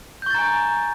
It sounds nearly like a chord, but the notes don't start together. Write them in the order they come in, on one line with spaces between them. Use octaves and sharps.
G6 C#6 A6 A#5 G#5